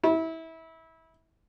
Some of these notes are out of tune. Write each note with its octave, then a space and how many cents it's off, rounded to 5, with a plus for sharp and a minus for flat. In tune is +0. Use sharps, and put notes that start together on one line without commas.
E4 -25